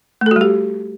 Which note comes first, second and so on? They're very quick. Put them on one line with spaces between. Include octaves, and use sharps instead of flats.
A3 A4 F#4 G3 G4